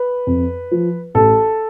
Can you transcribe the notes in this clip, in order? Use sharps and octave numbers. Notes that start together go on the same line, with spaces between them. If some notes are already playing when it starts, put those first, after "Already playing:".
Already playing: B4
F2
F3
A1 A4